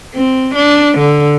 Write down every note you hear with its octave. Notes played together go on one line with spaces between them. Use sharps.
C4
D4
D3